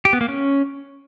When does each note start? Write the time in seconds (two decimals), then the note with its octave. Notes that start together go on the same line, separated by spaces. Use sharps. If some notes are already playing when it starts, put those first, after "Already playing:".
0.05 G4
0.13 B3
0.21 A#3
0.29 C#4